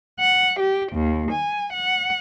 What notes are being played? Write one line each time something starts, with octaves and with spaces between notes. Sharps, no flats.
F#5
G4
D#2
G#5
F#5